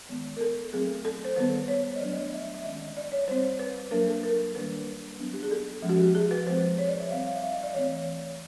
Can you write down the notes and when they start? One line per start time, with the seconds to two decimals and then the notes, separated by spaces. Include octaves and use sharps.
0.09 D#3 G#3 B3
0.37 A#4
0.41 A4
0.73 F#3 A3 C4 G#4
1.05 A4
1.25 C5
1.36 D#3 G3 B3 B4
1.68 C#5
1.96 D#5
2.00 F#3 A3 D4 D5
2.11 D5
2.16 D#5
2.33 E5
2.54 E5
2.64 D#3 G#3 C#4 D#5
2.97 D5
3.12 C#5
3.28 G3 C4 C5
3.59 B4
3.91 F#3 A#3 D4 A#4
4.07 A4
4.23 A#4
4.55 D#3 G3 A#3 D4 B4
5.19 F#3 B3 D4
5.34 G4
5.43 G#4
5.51 A4
5.82 F3 G#3 C#4
5.89 F#4
5.99 G4
6.15 G#4
6.31 B4
6.47 F3 G#3 C4 C5
6.78 C#5
6.89 D5
7.00 E5
7.11 G3 C4 F5
7.26 F5
7.36 E5
7.42 F5
7.52 D#5
7.63 D5
7.74 E3 A3 C4 C#5